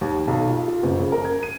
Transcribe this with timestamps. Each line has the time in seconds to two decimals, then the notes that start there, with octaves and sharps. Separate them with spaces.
0.01 D#2
0.28 B1
0.50 F4
0.67 F4
0.83 F#1
1.00 C#3
1.12 A#4
1.25 G#6
1.43 D#7